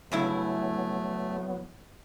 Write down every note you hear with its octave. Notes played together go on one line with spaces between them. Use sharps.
G2 C#3 F#3 A3 B3 E4